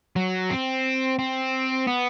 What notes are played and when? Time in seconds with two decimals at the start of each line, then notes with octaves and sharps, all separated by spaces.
0.16 F#3
0.50 C4
1.19 C4
1.87 B3